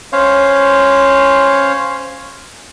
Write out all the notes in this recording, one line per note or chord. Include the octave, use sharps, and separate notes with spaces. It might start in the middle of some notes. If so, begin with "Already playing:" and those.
C#4 C5 C#5 F5